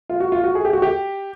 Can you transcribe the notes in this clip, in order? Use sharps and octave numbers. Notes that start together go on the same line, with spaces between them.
F4
F#4
F4
F#4
G#4
G4
F#4
G4